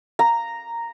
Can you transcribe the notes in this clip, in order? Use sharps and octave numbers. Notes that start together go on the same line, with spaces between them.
A#5